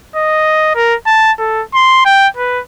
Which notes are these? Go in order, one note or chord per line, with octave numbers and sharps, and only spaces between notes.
D#5
A#4
A5
A4
C6
G5
B4